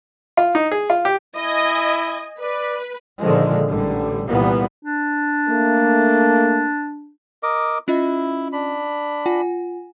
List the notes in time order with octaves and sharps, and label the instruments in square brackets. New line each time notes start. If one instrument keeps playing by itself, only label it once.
[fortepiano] F4
D#4
G#4
F4
G4
[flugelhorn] E4 [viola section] D#5 G#5
[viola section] B4 [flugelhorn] D5
[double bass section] A#2 D3 D#3 F3 G#3
A1 D3 G3
C2 A#2 E3 G3 A#3 B3
[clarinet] D4
[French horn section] A3 A#3
[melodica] A#4 D#5 D6
[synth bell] C#4 F4 D#5 [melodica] E4
[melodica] D4 B5
[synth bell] F4 F#5 G#5